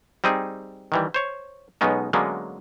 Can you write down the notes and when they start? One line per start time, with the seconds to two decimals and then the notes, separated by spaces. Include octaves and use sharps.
0.24 G3 C4 D#4 G#4
0.92 D#3 E3 G3
1.14 C5 C#5
1.81 B1 B2 G#3 B3 C#4 D#4
2.13 D3 F#3 G#3 A#3 B3 C#4